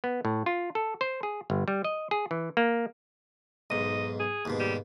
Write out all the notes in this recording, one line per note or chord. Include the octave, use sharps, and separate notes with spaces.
B3
A2
F4
A4
C5
G#4
G1
G3
D#5
G#4
E3
A#3
B1 G#2 D#5
G#4
D#2 G#2 B2
G3